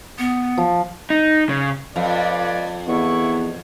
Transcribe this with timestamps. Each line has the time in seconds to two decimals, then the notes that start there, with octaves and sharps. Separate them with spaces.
0.19 B3
0.58 F3
1.10 D#4
1.49 C#3
1.96 F2 F4 B4 D5
2.88 E2 B3 E4 C#6